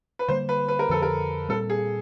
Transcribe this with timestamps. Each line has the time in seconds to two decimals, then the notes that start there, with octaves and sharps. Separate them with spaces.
0.19 B4
0.28 D3 G3 A#3 C5
0.49 B4
0.68 B4
0.79 A#4
0.89 F2 D3 F3 A4
1.02 A#4
1.49 A#2 G3 C4 A4
1.70 G#4